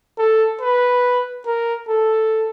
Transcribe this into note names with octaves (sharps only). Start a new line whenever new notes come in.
A4
B4
A#4
A4